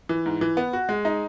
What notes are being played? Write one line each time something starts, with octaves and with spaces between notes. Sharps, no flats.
E3
G#2
E3
B3
F#4
G#3
D#4